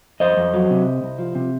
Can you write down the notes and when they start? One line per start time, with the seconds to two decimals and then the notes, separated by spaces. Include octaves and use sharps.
0.20 F2 C5 D#5
0.37 F2
0.53 F#3
0.70 C3
0.86 C2
1.03 C2
1.19 F3
1.35 C3